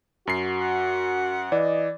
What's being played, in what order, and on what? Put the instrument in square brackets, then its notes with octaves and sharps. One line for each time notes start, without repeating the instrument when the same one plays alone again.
[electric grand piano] F#2 C7 [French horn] F#4
[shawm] F#5
[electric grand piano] E3 [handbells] D5 [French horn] D#5